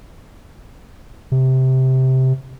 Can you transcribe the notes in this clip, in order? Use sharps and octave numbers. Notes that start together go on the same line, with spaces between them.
C3